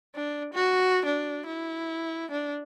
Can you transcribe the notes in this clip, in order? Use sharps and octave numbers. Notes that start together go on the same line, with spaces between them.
D4
F#4
D4
E4
D4